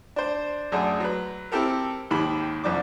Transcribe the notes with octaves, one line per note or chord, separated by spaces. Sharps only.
D4 C5
F#2 A3 D4 G#4
F#3 B4
C4 E4 G4 A4 A#4
D#2 G#2 D#3 G4 B5
C2 F2 D4 D6